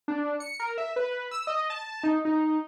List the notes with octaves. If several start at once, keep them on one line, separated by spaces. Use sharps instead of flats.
D4
C#7
A#4
E5
B4
E6
D#5
A5
D#4
D#4